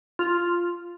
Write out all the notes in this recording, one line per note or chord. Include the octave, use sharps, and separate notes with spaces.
F4